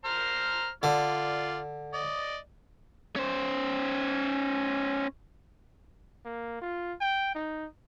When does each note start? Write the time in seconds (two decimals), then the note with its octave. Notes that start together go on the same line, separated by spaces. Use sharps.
0.05 C5 A#5 F6
0.83 D3 F4 D5
1.94 D5 D#5
3.16 C#4 C5
6.25 A#3
6.62 F4
7.01 G5
7.35 D#4